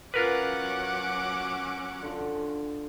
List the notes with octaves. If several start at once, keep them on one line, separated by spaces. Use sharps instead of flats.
F#3 C#4 F4 A#4 B4 F#5 D6
D3 F3